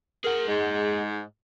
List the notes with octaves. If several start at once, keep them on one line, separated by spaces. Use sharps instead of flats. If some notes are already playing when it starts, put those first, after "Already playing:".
G#4 A#4 F#5
G#2 G#3